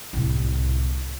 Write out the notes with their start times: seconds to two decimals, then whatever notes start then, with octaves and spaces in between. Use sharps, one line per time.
0.13 C2 A2